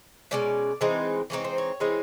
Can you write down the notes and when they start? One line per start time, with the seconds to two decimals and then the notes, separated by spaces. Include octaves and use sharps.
0.31 B2 G#3 C#4 D5
0.81 E3 G#3 C4 D#4
1.30 E3 G#3 C4 D#4 C#5
1.45 C5
1.58 C#5
1.80 E3 G#3 C4 D#4